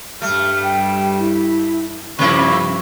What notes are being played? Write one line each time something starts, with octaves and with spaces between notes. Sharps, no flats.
G2 G3 A3 F6
G5
E4
G2 C3 F3 A#3 E4 C#6